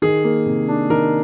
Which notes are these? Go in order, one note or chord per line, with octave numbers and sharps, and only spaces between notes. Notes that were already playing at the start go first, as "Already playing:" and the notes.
D#3 G#4
A#3
C3
D4
D#3 A#4